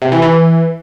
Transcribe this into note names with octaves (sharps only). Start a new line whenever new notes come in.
C3
E3
E3